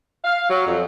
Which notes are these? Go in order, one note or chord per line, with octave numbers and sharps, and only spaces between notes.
F5
F#3
F2